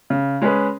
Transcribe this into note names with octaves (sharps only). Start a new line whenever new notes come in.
C#3
G#3 C#4 G#4 B4